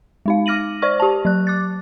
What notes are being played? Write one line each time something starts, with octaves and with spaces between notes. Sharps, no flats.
G#3 D#4 F5
D6 F6 A#6 D#7 F#7
C5 D5 C#6 F6
G4 A5
F#3 F#6
D6 F#6 A6